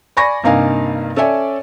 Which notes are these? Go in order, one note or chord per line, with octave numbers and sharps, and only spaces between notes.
D5 G#5 B5 C#6 A#6
G2 C3 A#3 D#4 F5 G#5
C#4 A4 C#5 D5 E5 G#5